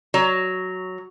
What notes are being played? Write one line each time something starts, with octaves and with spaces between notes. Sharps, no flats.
F#3